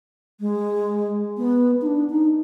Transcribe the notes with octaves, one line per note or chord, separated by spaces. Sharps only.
G#3
B3
D#4
D4
D#4